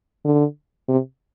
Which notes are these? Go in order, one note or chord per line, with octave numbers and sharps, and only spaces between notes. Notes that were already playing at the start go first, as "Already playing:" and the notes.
D3
C3